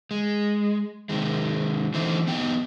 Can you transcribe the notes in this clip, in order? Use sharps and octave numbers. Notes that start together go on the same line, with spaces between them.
G#3
C3 D#3 G#3
D3 E3 A3 C4 D#4
B3 D#4 G4 G5